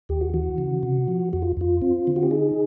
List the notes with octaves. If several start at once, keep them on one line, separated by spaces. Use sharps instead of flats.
D#2 G4
F#4
E3 F#4
C#3
C3
F3
F2 F#4
F4
F2 F4
C4
D3
F#4
G4
D#4 G#4